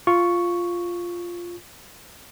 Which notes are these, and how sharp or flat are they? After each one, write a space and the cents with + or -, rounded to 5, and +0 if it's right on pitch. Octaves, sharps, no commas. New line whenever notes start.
F4 +0 C#6 +0